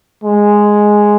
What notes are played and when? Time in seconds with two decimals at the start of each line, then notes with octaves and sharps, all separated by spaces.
0.24 G#3